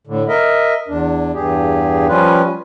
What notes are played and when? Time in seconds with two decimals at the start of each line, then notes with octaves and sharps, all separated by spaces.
0.07 A2 D3
0.28 A#4 D#5 E5
0.88 E2 D4
1.34 E2 G2 G4 G#4
2.09 F3 G3 C#4 F4 B4